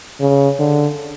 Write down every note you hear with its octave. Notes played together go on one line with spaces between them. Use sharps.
C#3
D3